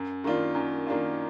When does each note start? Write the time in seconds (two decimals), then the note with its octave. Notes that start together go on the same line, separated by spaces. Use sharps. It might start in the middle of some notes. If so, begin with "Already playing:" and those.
Already playing: F#2
0.24 D#3 A#3 D4 F4
0.55 F#2
0.87 D#3 A#3 D4 F4